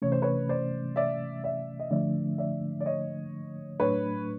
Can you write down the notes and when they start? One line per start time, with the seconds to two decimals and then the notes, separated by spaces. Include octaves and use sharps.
0.02 C3 E3 A3 C#4 C#5
0.12 C5
0.22 B4 C#5
0.49 C5 D5
0.96 D5 E5
1.44 D5 E5
1.80 D#5
1.91 D3 F3 A3 D4 D5 E5
2.38 D5 E5
2.81 D5
2.86 C#5 D#5
3.80 A2 F#3 A3 D4 B4 C#5